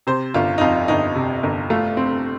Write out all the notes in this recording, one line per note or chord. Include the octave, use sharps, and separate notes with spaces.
C3 C5
G1 F4
D#4
F2 F4
G1 D#4
C3
G1
A3 F4
C4